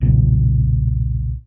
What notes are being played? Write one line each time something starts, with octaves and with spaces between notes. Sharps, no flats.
B1 E2 A#2 C#3